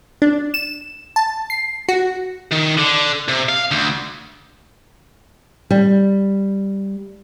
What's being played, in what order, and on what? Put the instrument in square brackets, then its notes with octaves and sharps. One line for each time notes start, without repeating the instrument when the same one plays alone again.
[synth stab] D4
E7
A5
C7
F#4
[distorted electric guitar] D#3
D3
C3
F5
D2
[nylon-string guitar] G3